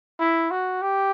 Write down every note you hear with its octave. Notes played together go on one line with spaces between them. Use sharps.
E4
F#4
G4